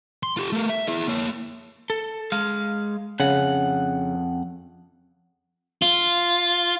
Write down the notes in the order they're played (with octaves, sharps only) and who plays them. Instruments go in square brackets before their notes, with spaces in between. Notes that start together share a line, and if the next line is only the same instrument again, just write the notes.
[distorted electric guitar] C6
F4 G4
A3 A#4
E5
E4 G#4
A#3 C#5
[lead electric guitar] A4
G#3 F5
[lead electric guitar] F2 F#5 [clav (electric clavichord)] C#3
[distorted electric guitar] F4